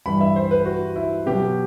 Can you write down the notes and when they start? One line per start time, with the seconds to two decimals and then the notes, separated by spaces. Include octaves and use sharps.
0.06 G2 E3 G3 B5
0.21 E5
0.36 C5
0.51 B4
0.66 F#4
0.96 E4
1.26 B2 F#3 G4